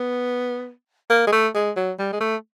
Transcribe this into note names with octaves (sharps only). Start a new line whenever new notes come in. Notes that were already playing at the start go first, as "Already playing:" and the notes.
Already playing: B3
A#3
G#3
A3
G#3
F#3
G3
G#3
A3